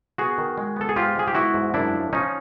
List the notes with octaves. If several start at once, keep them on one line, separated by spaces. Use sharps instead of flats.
B3 F#4 G#4
D#3
G#3
B3 A4
G#4
G#2 F4 G4
G#3 G#4
G4
B3 E4 F#4
G#2
F#2 D4 E4
F3
F3 C#4 D#4